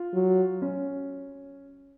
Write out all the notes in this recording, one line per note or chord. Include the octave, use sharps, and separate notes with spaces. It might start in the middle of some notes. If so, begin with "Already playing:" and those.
Already playing: F4
F#3
C#4